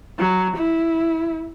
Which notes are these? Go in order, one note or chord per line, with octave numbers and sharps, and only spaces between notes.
F#3
E4